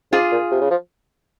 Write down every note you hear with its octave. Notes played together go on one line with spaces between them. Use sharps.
G#2 F4 G#4
A#2
C3
C#3
F3